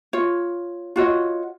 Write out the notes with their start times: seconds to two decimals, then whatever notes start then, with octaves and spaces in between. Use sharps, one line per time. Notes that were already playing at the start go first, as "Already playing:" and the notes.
0.13 F4 C#5
0.96 F4 F#4 C#5 D#5